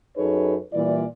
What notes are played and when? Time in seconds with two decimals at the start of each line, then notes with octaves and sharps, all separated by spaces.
0.17 F#2 D#4 G#4 A4 B4 C#5
0.73 A#2 E3 G3 E4 D5